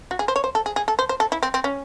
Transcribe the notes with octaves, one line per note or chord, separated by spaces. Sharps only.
F#4
G#4
C5
C#5
C5
A4
G#4
G#4
A4
C5
C5
A4
E4
C4
C4
C#4